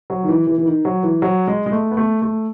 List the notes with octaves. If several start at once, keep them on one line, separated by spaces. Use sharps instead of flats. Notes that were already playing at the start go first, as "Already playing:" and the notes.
F#3
D#3
E3
E3
E3
D#3
F#3
E3
F#3
G#3
G#3
A3
B3
A3
A3